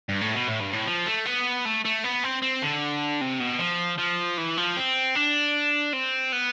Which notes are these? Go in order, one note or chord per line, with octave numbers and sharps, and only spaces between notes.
G2
A2
B2
A2
G2
A2
F3
A3
B3
A3
A3
B3
C4
C4
D3
C3
B2
F3
F3
E3
F3
C4
D4
C4
B3